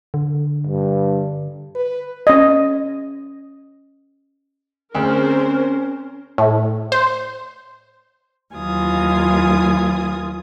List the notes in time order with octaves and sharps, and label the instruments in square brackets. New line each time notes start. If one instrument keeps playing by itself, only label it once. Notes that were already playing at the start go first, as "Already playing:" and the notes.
[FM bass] D3
[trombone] G2
[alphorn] B4
[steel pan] C#4 D#5
[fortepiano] D2 [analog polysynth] C4 G#4 [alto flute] C#4 [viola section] A#4 C5
[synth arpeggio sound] A2
C5
[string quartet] D#2 E3 F#3 F4 G#5 D#6